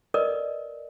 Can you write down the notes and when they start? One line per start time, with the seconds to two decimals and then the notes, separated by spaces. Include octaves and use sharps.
0.14 A#4 B4 D5 D#5